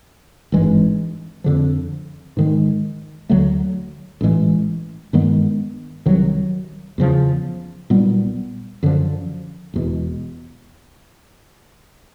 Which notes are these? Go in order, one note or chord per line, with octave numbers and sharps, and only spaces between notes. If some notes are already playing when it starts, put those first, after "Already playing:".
G#1 G2 E3 G#3
F2 D3 F3
G#2 D#3 G#3
D2 D3 F#3 A3
A1 A2 E3 G#3
G2 D#3 G#3 B3
C2 C3 D#3 F#3
E2 C#3 F3
B1 A#2 G3 B3
F#2 D3 F3
E1 E2 B2